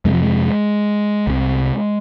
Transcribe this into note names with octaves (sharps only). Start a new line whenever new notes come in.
F2 C3 G#3
F3
G#3
C2 C3